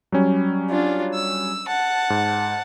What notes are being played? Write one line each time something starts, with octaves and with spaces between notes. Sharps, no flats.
F#3 G3 C#4
D4 F4
E6
F#5 A5
G#2